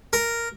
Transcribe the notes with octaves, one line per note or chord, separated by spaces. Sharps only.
A#4